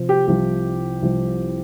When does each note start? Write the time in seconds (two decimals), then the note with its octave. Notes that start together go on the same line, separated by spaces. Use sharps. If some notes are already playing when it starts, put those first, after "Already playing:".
Already playing: C3 F3
0.09 G4
0.27 C2 C3 F3 G4
1.02 C2 C3 F3